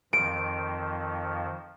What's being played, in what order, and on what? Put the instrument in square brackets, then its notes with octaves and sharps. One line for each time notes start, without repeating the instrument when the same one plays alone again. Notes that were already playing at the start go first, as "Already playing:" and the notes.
[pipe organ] F2 D#3 F3 [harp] D7